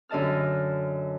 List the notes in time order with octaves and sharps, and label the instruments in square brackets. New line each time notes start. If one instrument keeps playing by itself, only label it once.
[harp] F#2 D3 D#5 A5 F6